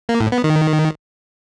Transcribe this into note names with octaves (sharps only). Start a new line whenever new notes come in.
A#3
A2
B3
D#3